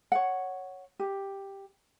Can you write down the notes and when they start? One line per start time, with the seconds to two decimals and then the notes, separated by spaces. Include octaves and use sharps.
0.12 C#5 F#5
0.99 G4